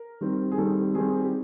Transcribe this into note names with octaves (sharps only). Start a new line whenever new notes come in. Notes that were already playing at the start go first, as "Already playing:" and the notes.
Already playing: A#4
D#3 G3 C4
G#4
D#3 G3 C4 A4
D#3 G3 C4 G#4
G4